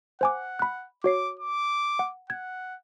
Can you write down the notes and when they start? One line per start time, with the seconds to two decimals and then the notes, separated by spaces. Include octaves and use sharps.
0.21 C5 F#5 G#5 D6
0.59 B5 F#6
1.04 F#4 C#5 D6 C7
1.40 D6
1.99 F#5
2.30 F#5 G#6